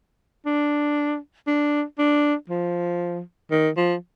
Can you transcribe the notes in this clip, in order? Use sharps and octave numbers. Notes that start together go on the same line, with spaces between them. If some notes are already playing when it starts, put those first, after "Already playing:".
D4
D4
D4
F3
D#3
F3